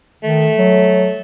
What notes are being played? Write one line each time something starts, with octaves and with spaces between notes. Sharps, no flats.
D#3 A3
F#3